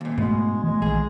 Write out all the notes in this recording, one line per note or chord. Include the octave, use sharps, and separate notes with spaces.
D#2 A#2
G#2 B2 G#3 A3 D4
E3 G#3 A3
A#1 D#3 G#4